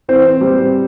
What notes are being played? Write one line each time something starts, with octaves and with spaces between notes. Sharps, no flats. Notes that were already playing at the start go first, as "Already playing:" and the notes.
E3 C4 C5
G3 C4